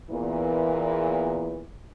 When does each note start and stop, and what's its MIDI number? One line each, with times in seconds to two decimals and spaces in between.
0.11 1.64 40
0.11 1.64 46
0.11 1.64 52